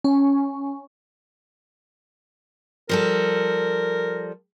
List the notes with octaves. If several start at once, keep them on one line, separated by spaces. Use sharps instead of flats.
C#4
F3 G3 A4 A#4